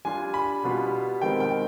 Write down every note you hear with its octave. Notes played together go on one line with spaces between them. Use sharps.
G3 D4 F4 G#5
B5
B2 G3 B3 F4
D#3 G#3 C4 F4 G5
G5